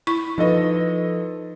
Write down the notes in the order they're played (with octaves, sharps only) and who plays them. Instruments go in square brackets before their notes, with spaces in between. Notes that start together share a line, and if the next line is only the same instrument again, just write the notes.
[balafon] E4 C#6
[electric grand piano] F3 A4 D#5 [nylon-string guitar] D#4 B4